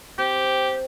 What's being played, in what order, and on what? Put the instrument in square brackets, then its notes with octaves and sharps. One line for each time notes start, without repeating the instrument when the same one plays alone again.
[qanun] C4 [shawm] G4